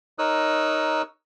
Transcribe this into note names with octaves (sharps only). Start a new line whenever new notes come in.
D#4 A#4 C#5 D#6 E6 F#6